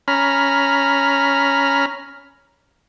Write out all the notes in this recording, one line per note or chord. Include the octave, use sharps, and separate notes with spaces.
C#4 A#5 B5 F6